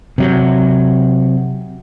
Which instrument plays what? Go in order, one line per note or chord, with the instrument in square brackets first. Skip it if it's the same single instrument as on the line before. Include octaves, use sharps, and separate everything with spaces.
[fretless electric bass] C3 F#3